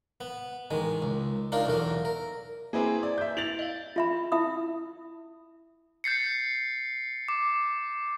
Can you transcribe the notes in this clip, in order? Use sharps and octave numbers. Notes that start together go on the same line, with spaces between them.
B3
A1 D#3 G#3
C#2
D4 D#4 F4 A#4
B1 E2 A3 A#4
A#4
A#3 C4 E4 G#4 B4 A#5
D5
E5 G6
E4 A6 F7 F#7
D#5 F5
F4 E5 B5
E4 E5 B5 D#6
G6 A6 C7 C#7
D6